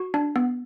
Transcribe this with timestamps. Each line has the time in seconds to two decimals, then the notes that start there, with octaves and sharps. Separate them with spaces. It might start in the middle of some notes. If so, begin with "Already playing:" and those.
Already playing: F#4
0.14 D4
0.36 B3